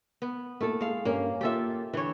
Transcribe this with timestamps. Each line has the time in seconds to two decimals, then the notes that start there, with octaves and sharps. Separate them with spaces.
0.22 B3
0.61 A3 A#3 E4 A4
0.81 G#3 F5
1.05 G2 G3 A#3 C#4
1.41 A#3 F4 G4 A4 E5
1.93 D3 E3 C#5